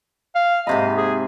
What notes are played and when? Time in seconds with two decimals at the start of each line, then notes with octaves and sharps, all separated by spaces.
0.35 F5
0.67 G#2 C3 D#5 B5
0.97 G#4